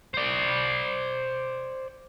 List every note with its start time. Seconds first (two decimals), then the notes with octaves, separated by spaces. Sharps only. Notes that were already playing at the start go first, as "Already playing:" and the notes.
0.14 C5 D5